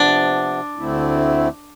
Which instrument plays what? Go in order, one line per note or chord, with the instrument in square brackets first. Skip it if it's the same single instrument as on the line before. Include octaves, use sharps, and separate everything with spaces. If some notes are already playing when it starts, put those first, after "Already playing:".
Already playing: [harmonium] C3 F3 B3 [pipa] D4
[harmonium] D2 D3 A3 C4 E4